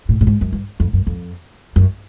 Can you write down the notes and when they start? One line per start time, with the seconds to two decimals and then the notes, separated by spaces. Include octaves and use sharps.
0.09 A2
0.21 A2
0.27 G#2
0.41 F#2
0.53 G2
0.80 F2
0.93 F#2
1.07 F2
1.76 F#2